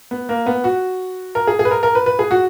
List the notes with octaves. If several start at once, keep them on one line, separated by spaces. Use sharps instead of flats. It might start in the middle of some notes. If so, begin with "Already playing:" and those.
B3
A#3
B3
F#4
A#4
G#4
G#4
B4
A#4
A#4
B4
B4
G#4
F#4